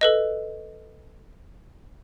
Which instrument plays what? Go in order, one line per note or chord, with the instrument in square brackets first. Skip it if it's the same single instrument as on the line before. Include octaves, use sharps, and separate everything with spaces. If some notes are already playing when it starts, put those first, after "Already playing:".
[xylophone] A4 B4 D#5